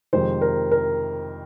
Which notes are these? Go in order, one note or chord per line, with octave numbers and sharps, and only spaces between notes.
F2 C3 D#3 G#3 C5
A#4
A#4